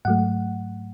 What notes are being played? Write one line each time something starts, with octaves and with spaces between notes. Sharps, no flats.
G#2 F#3 A3 F#5